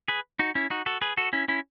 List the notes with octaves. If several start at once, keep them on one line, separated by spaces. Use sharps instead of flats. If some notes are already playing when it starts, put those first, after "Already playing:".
G#4 B4
D#4 F#4
C#4 E4
D#4 F#4
F#4 A4
G#4 B4
F#4 A4
C#4 E4
C#4 E4